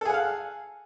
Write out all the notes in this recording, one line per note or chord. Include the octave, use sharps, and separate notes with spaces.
G#4 A4 F5 F#5